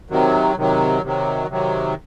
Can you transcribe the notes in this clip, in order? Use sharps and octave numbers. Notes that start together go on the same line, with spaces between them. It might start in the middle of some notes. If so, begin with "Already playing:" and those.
C3 D#3 F#3
C3 D#3 F#3
C3 D#3 F#3
C3 D#3 F#3